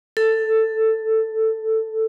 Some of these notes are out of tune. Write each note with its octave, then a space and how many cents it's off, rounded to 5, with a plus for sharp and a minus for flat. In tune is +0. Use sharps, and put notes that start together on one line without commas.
A4 +10